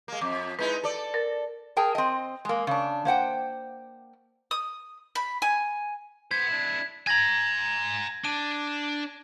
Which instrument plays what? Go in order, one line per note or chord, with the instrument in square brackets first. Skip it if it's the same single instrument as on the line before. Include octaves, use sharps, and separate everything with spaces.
[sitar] G#3 A#3
[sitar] F2 [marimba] D6
[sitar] G#3 D#4 E4 [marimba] B4
[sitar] A4 D5
[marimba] A#4 A6
[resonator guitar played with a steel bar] G#4 A#4 G5 A5
C4 D#5
G#3 A#3
C#3 D4
A#3 C5 F#5 G5
[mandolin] D#6
B5
G#5
[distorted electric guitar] B3 C5 [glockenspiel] G#6 [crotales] B6
[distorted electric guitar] D4 E4
[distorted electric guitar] G#5 A#5 [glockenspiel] G#6 A#6 F#7
[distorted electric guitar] D4 [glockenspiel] D#7